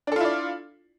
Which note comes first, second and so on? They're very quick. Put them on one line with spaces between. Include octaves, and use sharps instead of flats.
D4 A4 F4 E4 D5